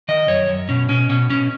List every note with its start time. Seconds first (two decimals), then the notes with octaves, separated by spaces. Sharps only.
0.08 D#3 D#5
0.28 F#2 C#5
0.49 F#2
0.69 B2 C#4
0.89 B2 C#4
1.10 B2 C#4
1.30 B2 C#4